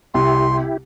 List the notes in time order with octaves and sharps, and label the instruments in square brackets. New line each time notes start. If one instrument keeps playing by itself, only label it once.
[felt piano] C2 [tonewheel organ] E4 G4 [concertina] C6